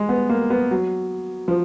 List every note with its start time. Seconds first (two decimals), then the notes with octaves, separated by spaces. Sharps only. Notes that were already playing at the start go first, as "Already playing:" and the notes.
Already playing: G#3
0.09 B3
0.29 A#3
0.50 B3
0.71 F#3
1.48 F3